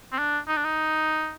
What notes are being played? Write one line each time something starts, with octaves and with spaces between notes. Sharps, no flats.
C4
D4
D#4
D4
D#4